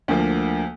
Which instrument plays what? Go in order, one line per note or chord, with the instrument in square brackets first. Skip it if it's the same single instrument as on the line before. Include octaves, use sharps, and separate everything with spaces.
[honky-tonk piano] D2 D3 F3 A#3